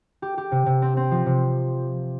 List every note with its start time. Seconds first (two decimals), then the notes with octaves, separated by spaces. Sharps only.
0.22 G4
0.38 G4
0.51 C3
0.66 C3
0.82 C4
0.97 C4
1.11 F3
1.26 C3